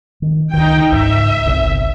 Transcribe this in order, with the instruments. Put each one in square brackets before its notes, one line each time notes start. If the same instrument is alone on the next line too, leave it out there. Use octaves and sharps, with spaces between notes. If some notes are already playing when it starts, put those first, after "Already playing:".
[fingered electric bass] D#3
[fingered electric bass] C#2 D#3 [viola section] D#4 G5
[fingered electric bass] C#2 G#2 [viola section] E5
[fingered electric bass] G1 C2